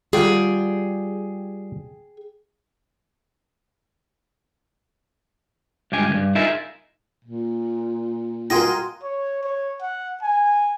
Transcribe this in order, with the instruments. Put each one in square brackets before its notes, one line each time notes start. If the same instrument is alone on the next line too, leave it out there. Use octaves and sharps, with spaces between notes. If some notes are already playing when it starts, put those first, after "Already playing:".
[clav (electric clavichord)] G3 F4 F#5 [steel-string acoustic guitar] G#4 G5
[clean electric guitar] C#2 G2 G4 G#5
D2 G2
D#4 F4 G#4 A#4 E5
[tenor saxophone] A#2
[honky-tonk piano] F4 F#4 A#4 [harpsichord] G#4 D#5 G5 [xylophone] C6 A#6
[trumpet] C#5
C#5
F#5
G#5